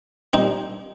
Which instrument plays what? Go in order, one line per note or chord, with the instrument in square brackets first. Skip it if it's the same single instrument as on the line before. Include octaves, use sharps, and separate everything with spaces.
[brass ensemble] A#2 G3 A#3 D4 G4 [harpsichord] C4 D#4